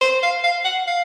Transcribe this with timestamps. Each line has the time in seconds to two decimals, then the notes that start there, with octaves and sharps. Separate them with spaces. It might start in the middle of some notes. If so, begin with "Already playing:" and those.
0.01 C5
0.22 F5
0.44 F5
0.65 F#5
0.87 F5